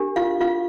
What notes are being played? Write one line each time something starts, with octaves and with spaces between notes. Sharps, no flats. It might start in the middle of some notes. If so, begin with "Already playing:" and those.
Already playing: D4 G4 A#4
F4 F5
F4 F5